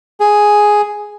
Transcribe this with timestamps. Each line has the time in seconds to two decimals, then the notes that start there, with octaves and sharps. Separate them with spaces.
0.20 G#4